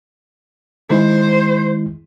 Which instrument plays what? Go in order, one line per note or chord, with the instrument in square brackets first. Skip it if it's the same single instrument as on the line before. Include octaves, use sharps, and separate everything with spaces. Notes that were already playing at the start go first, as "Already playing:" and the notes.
[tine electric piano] D#3 G#3 E4 [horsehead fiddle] C5